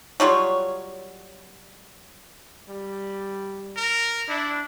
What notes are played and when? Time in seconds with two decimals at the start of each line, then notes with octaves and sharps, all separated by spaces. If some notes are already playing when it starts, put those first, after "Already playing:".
0.20 F#3 G3 F4 C#5
2.69 G3
3.76 A#4
4.29 D4 E4